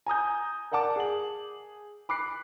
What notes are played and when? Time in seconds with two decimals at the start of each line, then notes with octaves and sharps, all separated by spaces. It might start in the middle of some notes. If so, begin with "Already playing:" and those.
0.06 G#5 A#5 D#6 G6
0.72 A#4 D5 F#5 A5 D6
0.96 G#4 F#7
2.09 B5 D6 F#6 C7